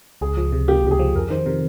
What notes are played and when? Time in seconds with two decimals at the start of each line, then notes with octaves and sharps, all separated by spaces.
0.21 C#2 G#4
0.37 F3
0.52 C3
0.68 A#3 G4
0.83 C#2 G4
0.91 G#4
0.99 F3
1.15 F2 A#4
1.30 D#3 C5
1.46 C3 A#4